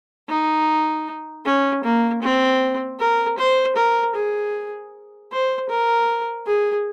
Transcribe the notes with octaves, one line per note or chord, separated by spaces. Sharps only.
D#4
C#4
A#3
C4
A#4
C5
A#4
G#4
C5
A#4
G#4